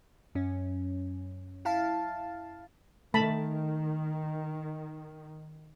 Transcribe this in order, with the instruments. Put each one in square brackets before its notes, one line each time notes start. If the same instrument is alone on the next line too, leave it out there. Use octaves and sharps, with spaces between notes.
[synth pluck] F#2 C#4
E4 F5 A5
[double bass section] D#3 [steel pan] A3 A5 B5